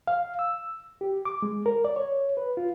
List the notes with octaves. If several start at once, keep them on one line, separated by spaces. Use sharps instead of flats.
F5
E6
G4
D6
G#3
A#4
D5
C#5
B4
F4